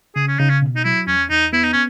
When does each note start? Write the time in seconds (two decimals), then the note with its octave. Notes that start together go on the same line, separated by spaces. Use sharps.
0.16 C#3 G#4
0.28 C#4
0.39 C#3 D#4
0.50 C#4
0.62 B2
0.76 D#4
0.85 F#3 E4
1.07 E2 C#4
1.30 E2 D#4
1.53 B3 E4
1.63 D#4
1.73 C#4